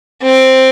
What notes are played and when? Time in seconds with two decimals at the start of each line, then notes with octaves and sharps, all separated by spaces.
0.23 C4